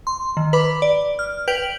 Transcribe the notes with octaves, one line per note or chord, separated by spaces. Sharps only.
C6
D#3
B4 B5 D6
D5
F6
B4 G5 G6 D7 F7 F#7